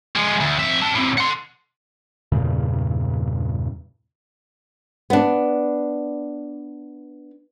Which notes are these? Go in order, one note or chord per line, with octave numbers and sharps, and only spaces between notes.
F3 G#3
D2
F2 E5
C4 A5
A2 C4
F#5 C6
E2 G2 A#2 C#3
B3 D4